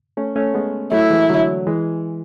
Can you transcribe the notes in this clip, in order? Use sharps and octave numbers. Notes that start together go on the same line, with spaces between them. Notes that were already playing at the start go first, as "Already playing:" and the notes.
A3 C#4
A3 C#4
G#3 B3
F#3 A3 E4
E3 G#3
D3 F#3
E3 G#3